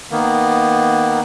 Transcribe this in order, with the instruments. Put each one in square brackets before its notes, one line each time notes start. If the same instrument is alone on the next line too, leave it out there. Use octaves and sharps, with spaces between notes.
[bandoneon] D#3 A#3 B3